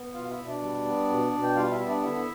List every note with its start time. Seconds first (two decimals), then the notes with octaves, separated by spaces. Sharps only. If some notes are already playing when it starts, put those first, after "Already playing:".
Already playing: B3
0.14 B2 F4 F5
0.25 F5
0.30 E4 E5
0.38 B2
0.46 D4 D5
0.61 G3
0.85 B3
1.09 B2
1.33 B2
1.43 G5
1.55 G3 F4 F5
1.66 F5
1.71 E4 E5
1.79 B3
1.87 D4 D5
2.03 D3 E4 E5